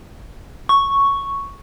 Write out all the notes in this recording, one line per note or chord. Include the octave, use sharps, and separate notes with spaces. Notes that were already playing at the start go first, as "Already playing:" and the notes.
C#6